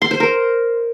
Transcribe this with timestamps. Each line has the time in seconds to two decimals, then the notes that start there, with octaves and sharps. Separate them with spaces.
0.02 C6
0.11 C5
0.20 A#4